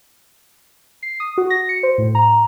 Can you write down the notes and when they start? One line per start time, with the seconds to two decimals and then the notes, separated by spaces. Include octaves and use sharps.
1.03 C7
1.20 D#6
1.38 F#4
1.50 A#6
1.69 C#7
1.83 C5
1.98 A2
2.15 A#5